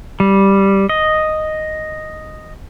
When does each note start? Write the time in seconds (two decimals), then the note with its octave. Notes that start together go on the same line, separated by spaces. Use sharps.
0.20 G3
0.89 D#5